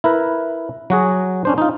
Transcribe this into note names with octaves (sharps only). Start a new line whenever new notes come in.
E4 A#4 B4
F#3 F#4 G#4
C#4 D4 C5
D#4 F4